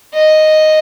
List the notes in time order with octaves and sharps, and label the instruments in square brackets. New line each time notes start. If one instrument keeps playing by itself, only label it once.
[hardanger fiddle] D#5